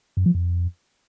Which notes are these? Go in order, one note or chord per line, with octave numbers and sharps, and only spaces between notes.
F#2
F3
F2